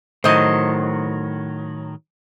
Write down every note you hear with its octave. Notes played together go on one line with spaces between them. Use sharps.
A2 D#3 F#3 C5 D#5